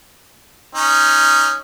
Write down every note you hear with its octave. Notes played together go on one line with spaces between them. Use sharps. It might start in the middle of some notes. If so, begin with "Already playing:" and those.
C#4 D#4